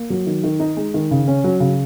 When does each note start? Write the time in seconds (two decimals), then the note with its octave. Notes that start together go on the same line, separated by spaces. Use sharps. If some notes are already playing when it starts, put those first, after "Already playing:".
Already playing: A#3
0.10 F#3
0.27 D#3
0.44 D#3
0.60 D#4
0.77 G#3
0.94 D#3
1.11 C#3
1.28 C#4
1.44 F#3
1.60 C#3